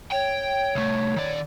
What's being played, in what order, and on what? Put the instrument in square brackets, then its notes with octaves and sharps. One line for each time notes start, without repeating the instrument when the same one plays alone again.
[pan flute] C#5 [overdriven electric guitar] G5
[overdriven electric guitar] C2 A3
D#3 D5